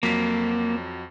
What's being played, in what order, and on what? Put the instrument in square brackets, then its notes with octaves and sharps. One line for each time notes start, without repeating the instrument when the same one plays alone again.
[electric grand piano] F2 F#3 B6 [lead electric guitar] A#3